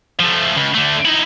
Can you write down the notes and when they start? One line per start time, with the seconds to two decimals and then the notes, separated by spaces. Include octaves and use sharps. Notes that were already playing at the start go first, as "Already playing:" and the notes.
0.19 F3 A3
0.57 C#2
0.74 D3 A3
1.05 D#4 E4